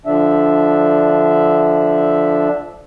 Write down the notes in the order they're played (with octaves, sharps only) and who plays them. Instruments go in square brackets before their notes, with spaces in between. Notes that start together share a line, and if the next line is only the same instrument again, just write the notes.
[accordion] D3 F3 D4 E5